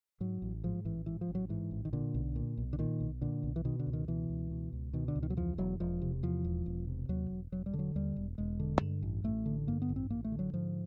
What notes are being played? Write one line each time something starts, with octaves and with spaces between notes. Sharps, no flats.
G#2 F#3
A1
G#2 F3
A1 E3
G#2 E3
F3
A1
F#3
G#2 E3
A1
D#3
A#2 D3
B1
A#2
B1
D3
A#2 D#3
B1
A#2 D3
B1
E3
B2 D#3
D3
C#2
D#3
B2 E3
C#2
B2
C#2
B2 D#3
D3
C#2
D#3
F#3
E2 F3
E1 F#3
E1 F3
C3
E2 F3
E1
E1
C3
D#2 F#3
E1
E1 F#3
G3
D3
F#3
D#2 G3
E1
E1 G#3
D3
G2
A1
A1 A3
D3
G2 A#3
B3
A1
C4
A1 A#3
A3
D3
F#3
G#2 F3